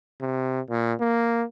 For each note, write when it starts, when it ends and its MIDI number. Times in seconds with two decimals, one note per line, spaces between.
0.21 0.61 48
0.70 0.93 46
1.00 1.44 58